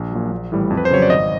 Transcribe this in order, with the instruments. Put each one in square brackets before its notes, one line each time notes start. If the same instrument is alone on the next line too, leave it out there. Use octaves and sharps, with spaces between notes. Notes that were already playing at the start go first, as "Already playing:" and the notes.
Already playing: [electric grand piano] A#1
A#2 F#3
A#1
A2 E3 G3
F2
B4
C5
C#3 F#3 C#5
D5
G#1 D#5